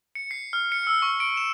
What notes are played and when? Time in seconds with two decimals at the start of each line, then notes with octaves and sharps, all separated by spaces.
0.15 C#7
0.31 C7
0.53 F6
0.72 C#7
0.87 E6
1.02 C#6
1.20 D7
1.37 E7